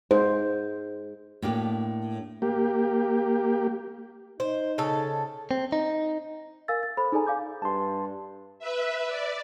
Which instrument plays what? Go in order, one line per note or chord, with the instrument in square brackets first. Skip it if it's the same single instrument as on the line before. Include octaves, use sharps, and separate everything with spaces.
[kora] G#2 [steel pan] C5
[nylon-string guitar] A2 A#3 D4 G4
[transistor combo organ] A#3 G4
[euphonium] D#4 [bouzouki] C5
[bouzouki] C#3 A4
[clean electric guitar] C4
D#4
[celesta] A#4 F5 G#5 E6 A6
A6
A4 C5 B5
D#4 G#4 A4 D5 G#5 A#5
F5 G#5 D6 G6
[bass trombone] G2 [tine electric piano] A5 C6
[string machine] B4 E5
D5